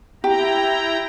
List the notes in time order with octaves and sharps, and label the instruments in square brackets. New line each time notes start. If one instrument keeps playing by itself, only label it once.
[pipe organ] E4 G5 A#5 [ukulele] G4